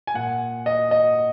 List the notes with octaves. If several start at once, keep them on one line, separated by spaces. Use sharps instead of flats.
G#5
A#2 F#5
D#5
D#5